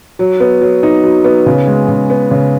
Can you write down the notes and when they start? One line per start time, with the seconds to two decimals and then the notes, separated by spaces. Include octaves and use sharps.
0.19 F#3
0.40 B3
0.61 F#3
0.83 D#4
1.04 F#3
1.24 B3
1.46 C#3
1.67 G#3
1.88 C#3
2.10 B3
2.31 C#3